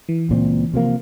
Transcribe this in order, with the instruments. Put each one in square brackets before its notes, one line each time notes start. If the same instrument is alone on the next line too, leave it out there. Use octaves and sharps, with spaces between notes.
[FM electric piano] E3
[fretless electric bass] C#2 A#2 C4
C3 F3 A#3